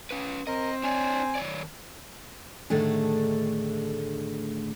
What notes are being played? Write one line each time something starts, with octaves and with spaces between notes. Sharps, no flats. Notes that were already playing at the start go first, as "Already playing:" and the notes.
C#4 B4
C4 A#4 D#5
D4 C#5 D5 G#5
D#3 C#5 D5
A2 D3 D#3 A3 D4 G#4